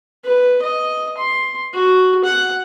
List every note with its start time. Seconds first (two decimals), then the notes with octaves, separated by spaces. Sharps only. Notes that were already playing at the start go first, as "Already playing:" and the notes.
0.24 B4
0.62 D#5
1.18 C6
1.74 F#4
2.25 F#5